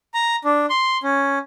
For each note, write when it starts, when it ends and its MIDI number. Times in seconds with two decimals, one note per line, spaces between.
0.14 0.36 82
0.44 0.66 62
0.70 0.97 84
1.03 1.39 61